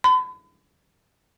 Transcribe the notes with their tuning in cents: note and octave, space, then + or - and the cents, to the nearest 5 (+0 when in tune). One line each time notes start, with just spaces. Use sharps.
B5 +40